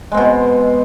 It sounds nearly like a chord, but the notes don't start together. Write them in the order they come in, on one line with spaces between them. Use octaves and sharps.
G#3 C4 B2